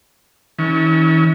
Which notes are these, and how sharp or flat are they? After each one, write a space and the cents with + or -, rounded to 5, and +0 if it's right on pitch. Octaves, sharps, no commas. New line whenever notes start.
E3 -40 C#4 +5